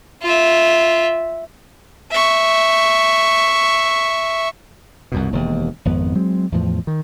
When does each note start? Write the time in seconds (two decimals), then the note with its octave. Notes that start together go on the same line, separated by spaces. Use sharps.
0.23 F4 E5
2.10 E5 C#6
5.12 C2 F#2 B2
5.33 E1 D#2
5.85 G#1 F2 B3
6.15 F#3 G#3 C4
6.52 E2 A2 F3
6.87 D#3